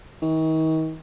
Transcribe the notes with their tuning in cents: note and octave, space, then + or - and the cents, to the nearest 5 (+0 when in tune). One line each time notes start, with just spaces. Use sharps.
D#3 +40